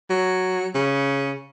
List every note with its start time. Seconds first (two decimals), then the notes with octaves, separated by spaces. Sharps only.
0.10 F#3
0.74 C#3